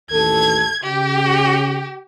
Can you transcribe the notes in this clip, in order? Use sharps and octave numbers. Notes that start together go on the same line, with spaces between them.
A1 D#2 A4 G#6
C#3 G4